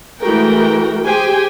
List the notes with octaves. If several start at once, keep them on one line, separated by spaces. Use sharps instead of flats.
E3 G#3 A3 F#4 A#4 G5
G4 G#4 C5 G5 G#5